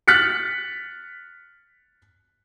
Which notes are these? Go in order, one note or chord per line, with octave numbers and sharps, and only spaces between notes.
F6 F#6 A6 B6 C#7